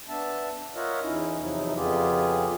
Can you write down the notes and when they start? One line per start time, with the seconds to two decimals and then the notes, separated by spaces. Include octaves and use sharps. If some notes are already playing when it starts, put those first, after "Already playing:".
0.09 B3 D4 E5 A5
0.75 F4 A#4 C#5 D#5 E5 F#5
1.02 E2 C#4 D#4 E4
1.39 E2 C3 F3 F#3 D#4 E4
1.76 F2 C#3 B3 F4 G4 G#4